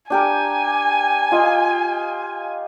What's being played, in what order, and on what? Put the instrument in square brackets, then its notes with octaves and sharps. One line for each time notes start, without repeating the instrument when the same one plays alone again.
[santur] D4 G4 A#4 [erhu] G#5
[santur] F4 D#5 F5